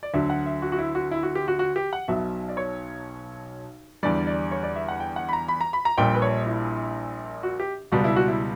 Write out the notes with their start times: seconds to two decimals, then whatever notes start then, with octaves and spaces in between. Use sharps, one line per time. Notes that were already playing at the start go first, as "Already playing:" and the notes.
0.03 D5
0.14 D2 D3 F#3 E5
0.30 F#5
0.46 E5
0.62 F#4
0.72 F#4
0.78 E4
0.95 F#4
1.11 E4
1.23 F#4
1.35 G4
1.48 F#4
1.59 F#4
1.76 G4
1.93 F#5
2.08 B1 B2 F#3 E5
2.49 D5
2.57 C#5
4.03 E2 D3 G3 D5
4.27 D5
4.51 C#5
4.63 D5
4.76 E5
4.89 F#5
5.00 G5
5.16 F#5
5.29 B5
5.33 A#5
5.48 B5
5.61 A#5
5.73 B5
5.85 A#5
5.98 A#1 A#2 G3 G5
6.14 B4
6.22 C#5
6.46 E4
7.43 F#4
7.60 G4
7.92 C#2 B2 G3 F#4
8.04 E4
8.16 F#4
8.28 E4